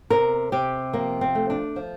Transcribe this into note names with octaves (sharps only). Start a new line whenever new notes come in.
C3 A#4
C3 G4
F3 A#3
C4
A3
D4
F3